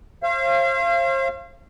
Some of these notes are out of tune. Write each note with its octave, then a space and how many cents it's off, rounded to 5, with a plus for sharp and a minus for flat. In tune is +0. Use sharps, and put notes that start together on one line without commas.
C5 +40 F5 -35